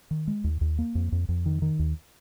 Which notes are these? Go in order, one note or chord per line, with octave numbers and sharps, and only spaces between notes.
D#3
G#3
D#2
D#2
A#3
F2
F2
F2
D#3
D#3
D#2